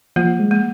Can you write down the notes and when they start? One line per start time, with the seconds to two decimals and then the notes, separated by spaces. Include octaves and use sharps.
0.16 F3 A#3
0.39 G#3
0.51 A#3